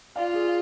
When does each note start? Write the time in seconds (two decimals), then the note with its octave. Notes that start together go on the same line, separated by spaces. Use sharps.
0.16 F4 D5 F5
0.34 G#4